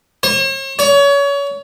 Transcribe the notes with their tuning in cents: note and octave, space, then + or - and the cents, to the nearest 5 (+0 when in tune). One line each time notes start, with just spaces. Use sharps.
C#5 -45
C#5 +30